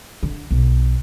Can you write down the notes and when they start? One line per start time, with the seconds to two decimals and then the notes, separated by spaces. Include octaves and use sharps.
0.23 D3
0.51 B1